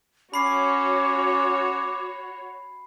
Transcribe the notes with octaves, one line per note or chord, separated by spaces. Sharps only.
C#4 F#4 C#5 B5 D6 C7